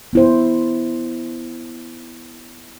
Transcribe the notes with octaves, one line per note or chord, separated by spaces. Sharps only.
B3 E4 C5